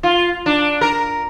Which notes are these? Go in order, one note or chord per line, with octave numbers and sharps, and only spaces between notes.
F4
D4
A#4